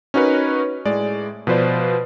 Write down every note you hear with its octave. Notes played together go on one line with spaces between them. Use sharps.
C#4 D#4 F#4 A#4 B4 C#5
A2 G#3 D5
B2 F3 B4 C5 D5